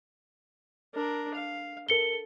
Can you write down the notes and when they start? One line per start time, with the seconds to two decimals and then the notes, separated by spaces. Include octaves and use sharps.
0.95 D4 A#4
1.35 F5
1.89 A4 A#4 C#7 G7